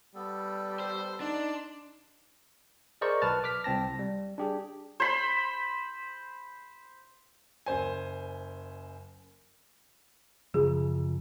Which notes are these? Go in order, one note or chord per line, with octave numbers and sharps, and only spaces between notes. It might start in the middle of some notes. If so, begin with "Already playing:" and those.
G3 B3 A4
C5
D4 D#4 D5 A5 C6
G#4 A#4 C5 D5 D#5 C#6
B1 B4 A5 F6 A6
D6 F6 B6
C2 C4 A5 A#6
G3
D4 G4 G#4
C5 B5
F#1 C5 G#5
F#2 C#3 F3 G#4